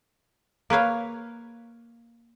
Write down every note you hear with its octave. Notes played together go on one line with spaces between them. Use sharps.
A#3 B4 C#5 F5